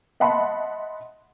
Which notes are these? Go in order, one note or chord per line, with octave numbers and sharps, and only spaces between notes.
D#5 E5 F#5 A5 B5 C6